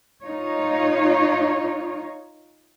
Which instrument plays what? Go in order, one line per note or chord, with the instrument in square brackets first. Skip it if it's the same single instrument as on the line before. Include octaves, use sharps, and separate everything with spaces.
[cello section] D#4 F4 C#5